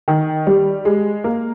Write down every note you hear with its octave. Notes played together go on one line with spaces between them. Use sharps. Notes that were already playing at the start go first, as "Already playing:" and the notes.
D#3
G3
G#3
A#3